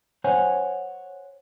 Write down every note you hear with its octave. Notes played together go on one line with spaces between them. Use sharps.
C5 C#5 F#5 G#5